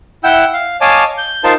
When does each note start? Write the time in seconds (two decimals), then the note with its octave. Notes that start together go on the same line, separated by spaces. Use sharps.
0.24 E4 F#5 G5 E6 G6
0.53 F5
0.81 C#5 D#5 F5 G#5 A5 D6
1.18 G6
1.44 D#4 F4 A#4 C5 F5 A5